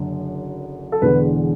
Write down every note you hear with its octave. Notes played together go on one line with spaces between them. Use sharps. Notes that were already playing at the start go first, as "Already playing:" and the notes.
Already playing: F#1 F#2 D3
A4
E1 E2 D3 B4